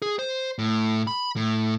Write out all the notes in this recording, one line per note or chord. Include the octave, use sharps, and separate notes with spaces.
G#4
C5
A2
B5
A2